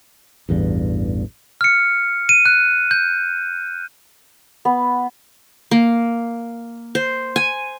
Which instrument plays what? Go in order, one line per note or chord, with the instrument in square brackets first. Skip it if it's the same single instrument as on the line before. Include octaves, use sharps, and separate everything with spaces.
[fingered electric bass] A1 E2 G2
[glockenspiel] F6 C#7
D#7
F#6
G6
[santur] B3
[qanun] A#3
C5
G#5